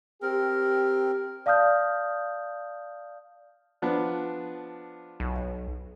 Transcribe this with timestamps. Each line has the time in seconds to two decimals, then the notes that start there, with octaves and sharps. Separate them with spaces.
0.22 C4 G4 A#4
1.46 D5 F5 A5 D#6 F6 G6
3.82 F3 B3 D4
5.20 B1